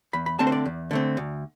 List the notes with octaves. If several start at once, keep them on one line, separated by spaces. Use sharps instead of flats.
E2 B5
B5
D3 A3 C4 A5
C5
D5
E2
D3 A3 C4
D2